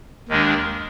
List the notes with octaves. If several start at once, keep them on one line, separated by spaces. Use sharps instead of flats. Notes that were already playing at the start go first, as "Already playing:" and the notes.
D#2 D#3 G#3 D4